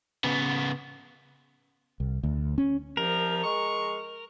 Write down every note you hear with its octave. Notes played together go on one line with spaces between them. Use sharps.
C#3 B3
C2
D2
C#4
C2 C3 F3 A#4
G#3 C#6